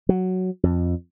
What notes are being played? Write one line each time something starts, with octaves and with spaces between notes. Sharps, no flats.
F#3
F2